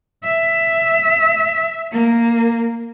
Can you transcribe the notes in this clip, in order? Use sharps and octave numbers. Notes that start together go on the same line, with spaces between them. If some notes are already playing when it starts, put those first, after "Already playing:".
E5
A#3